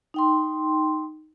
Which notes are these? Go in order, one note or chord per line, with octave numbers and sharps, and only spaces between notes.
D#4 G5 C6